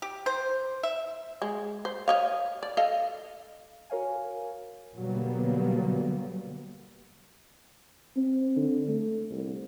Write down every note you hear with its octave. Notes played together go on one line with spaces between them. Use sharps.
G4
C5
E5
G#3
C5
C#5 D#5 F5
D5
A4 D#5 F5
F#4 A#4 C#5 F5 G#5
B2 D3 F#3 G3 A#3 B3
C4
D3
A3
C2